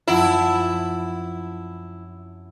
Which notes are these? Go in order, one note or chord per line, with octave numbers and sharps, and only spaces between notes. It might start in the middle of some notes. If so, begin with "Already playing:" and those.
F#2 F3 C4 E4 F4 F#5 A5